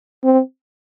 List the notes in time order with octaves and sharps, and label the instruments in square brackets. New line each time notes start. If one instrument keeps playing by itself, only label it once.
[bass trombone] C4